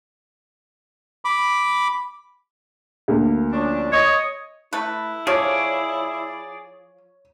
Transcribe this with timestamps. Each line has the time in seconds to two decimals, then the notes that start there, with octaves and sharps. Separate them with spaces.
1.25 B5 D6
3.08 D2 A#3
3.52 F3 C#4 D4
3.92 C#5 D#5
4.73 A3 E4 B4
5.27 F3 G#4 C#5 D5